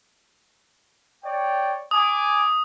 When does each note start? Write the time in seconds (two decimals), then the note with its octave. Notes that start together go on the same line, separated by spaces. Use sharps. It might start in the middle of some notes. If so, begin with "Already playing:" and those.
1.23 C#5 D5 G5
1.91 G#5 D6 D#6